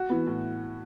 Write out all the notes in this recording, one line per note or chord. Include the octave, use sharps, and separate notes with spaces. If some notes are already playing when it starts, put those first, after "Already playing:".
Already playing: F#4
E3 B3
A2